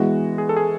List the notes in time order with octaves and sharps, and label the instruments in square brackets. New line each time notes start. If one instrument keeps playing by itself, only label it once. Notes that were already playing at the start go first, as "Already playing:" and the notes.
Already playing: [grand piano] E3 G#3 B3 E4 [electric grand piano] F#4
[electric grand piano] G#4
A4
G#4